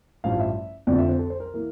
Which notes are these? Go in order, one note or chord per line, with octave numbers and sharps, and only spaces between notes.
A1 G2 F3 F5
E5
F2 D3 F3 D5
E5
C5
A4
C5
A#4
E3 A#3